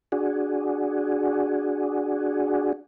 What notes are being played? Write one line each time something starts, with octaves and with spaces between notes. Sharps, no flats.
D4 F#4 G#4